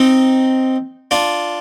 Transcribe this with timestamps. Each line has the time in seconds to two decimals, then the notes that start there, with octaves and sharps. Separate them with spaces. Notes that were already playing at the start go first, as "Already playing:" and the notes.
Already playing: C4 D#4
1.11 D4 F4